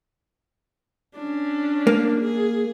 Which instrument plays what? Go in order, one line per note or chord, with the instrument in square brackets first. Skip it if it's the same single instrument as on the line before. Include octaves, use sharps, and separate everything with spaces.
[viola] C#4 D4
[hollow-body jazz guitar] A#3
[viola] G#4